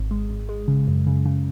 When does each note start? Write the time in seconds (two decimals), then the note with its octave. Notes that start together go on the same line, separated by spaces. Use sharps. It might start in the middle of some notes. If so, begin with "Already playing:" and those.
Already playing: G#1
0.11 G#3
0.30 G#1
0.49 G#3
0.68 C#3
0.88 F#2
1.07 C#3
1.26 C#3